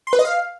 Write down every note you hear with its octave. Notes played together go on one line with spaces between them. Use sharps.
C6
B4
D#5
F5